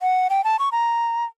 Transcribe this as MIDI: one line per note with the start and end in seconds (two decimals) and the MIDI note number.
0.01 0.28 78
0.30 0.44 79
0.44 0.59 81
0.59 0.69 85
0.72 1.25 82